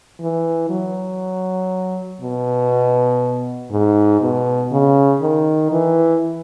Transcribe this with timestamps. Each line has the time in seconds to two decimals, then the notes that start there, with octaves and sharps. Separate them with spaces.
0.21 E3
0.70 F#3
2.21 B2
3.72 G#2
4.21 B2
4.71 C#3
5.22 D#3
5.72 E3